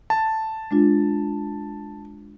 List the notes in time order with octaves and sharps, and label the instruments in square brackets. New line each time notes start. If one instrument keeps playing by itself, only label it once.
[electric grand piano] A5
[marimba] G#3 D4 F4